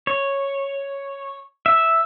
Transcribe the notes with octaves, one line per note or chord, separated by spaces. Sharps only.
C#5
E5